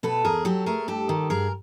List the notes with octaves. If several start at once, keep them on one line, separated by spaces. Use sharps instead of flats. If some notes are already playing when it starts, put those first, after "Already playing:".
B2 A4 B4
E2 G#4 A#4
F#3 G4 A4
A3 G#4 A#4
G2 G4 A4
D#3
G2 G#4 A#4